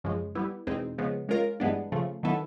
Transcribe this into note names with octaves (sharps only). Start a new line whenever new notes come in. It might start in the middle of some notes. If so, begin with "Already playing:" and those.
F#2 C#3 F3 G#3
G3 B3 E4
E2 B2 G#3 C4 D#4
C#3 F3 G#3 B3
G#3 C#4 F4 A#4
G2 E3 G#3 B3 D4
C#3 F3 A3
D#3 F#3 B3 E4 A4